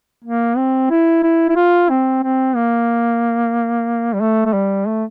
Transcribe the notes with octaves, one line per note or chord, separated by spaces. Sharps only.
A#3
C4
E4
E4
E4
F4
C4
C4
A#3
G3
A3
A3
G3
A3